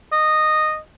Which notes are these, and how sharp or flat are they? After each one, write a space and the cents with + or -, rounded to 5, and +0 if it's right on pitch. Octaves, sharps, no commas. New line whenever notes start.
D#5 -10